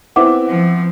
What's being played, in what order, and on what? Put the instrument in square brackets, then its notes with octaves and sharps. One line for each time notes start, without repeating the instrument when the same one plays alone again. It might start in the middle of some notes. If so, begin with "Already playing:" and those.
[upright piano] B3 C4 E4 [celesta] F#5 D6
[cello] F3